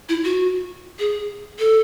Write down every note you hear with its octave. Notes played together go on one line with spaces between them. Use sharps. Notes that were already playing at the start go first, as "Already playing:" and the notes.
E4
F#4
G#4
A4